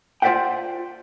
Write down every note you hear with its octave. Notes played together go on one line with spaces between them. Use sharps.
F4 C5 D5 E5 F#5 G5